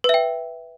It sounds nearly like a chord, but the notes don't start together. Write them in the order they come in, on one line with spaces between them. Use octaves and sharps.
B4 E5 G5